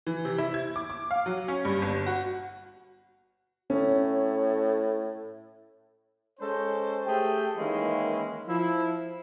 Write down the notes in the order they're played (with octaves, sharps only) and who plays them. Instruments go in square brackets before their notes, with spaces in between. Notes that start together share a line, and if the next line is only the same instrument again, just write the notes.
[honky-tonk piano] E3
C3
E4
G#6
D6
D6
F5
F#3
C#4
G2
G1
F#4
[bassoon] A2 [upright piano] C#4
[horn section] G#3 C#4 A4 C5
A3 G4 G#4 G5
D#3 E3 G#3 A#3 C#4 E4
F3 E4